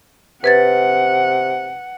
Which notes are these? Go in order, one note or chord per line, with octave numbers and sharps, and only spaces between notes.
C3 B4 F#5 G#6 A6